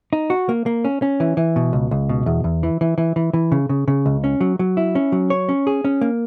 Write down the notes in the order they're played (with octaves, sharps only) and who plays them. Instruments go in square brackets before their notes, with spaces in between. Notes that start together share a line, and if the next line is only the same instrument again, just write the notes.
[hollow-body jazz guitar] D#4
F#4
A#3
A#3
C#4
C#4
E3
E3
B2
C#2
C#2
B2
E2
E2
E3
E3
E3
E3
E3
C#3
C#3
C#3
C#2
C#4
F#3
F#3
E4
C#4
F#3
C#5
C#4
G#4
C#4
A#3